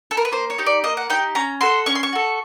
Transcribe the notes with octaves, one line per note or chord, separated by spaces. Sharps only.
A4
A#4
B4
A#3 C5
C#5
D#4 G4
D5
A#3 D#5
F#5
D#4 G4 G5
C#4 A#5
F#4 A4 C6
C#4 C#6
C6
C#6
F#4 A4